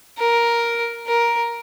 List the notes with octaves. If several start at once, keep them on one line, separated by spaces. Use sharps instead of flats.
A#4
A#4